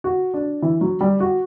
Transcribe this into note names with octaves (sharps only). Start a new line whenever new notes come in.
F#4
D4
E3
F#3
G3
F#4